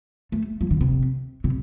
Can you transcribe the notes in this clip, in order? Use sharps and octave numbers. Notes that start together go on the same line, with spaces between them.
A3
F3
D3
C3
C3